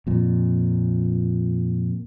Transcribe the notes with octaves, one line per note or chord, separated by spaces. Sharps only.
F2 A#2